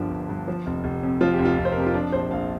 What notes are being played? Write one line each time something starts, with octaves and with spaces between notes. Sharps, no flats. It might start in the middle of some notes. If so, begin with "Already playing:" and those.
Already playing: G1 G2 D3 F3 D4 G4 A#4
G1
G2
F3
F1
F1
F2
F3 F4
G4
F1
F4
F1
C5
A#4
F2 G4
F4
F3 D4
A#1 C5
A#1 F5